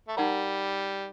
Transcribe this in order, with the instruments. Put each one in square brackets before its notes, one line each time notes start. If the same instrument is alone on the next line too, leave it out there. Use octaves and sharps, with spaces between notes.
[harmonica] A3
[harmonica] G3 [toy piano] D#4 G4 A#4 F#5 A#5